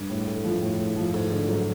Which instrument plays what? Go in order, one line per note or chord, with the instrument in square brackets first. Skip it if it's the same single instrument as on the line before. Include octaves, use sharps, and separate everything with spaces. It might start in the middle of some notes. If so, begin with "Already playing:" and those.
Already playing: [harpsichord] G2
[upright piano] A2
A3
F3
A2
A2
F3
[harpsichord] G#2 [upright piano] A3
[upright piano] D3
F#3